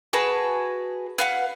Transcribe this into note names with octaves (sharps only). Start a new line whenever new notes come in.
F#4 G#4 B4 A5
B4 F5 F#5